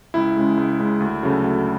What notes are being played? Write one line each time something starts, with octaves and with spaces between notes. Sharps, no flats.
C#2 E4
C#3 G#3
C#2
C#3 G#3
D2
C#3 F#3 A3
D2